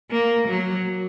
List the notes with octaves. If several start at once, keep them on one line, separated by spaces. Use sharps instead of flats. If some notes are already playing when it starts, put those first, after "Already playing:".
A#3
F#3